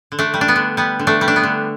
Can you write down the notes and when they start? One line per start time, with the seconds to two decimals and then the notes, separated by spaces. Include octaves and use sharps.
0.12 D3
0.19 A3 D4
0.34 G3
0.41 D4
0.48 B3
0.56 D3
0.77 G3 B3
0.99 D3
1.07 A3 D4
1.21 G3
1.28 D4
1.36 B3
1.44 D3